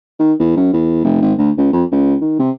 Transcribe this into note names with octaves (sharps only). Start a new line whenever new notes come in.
D#3
E2
F#2
E2
F1
G#1
D2
C#2
F2
C#2
D#3
C3